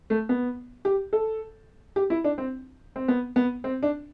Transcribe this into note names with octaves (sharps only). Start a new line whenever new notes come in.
A3
B3
G4
A4
G4
E4
D4
C4
C4
B3
B3
C4
D4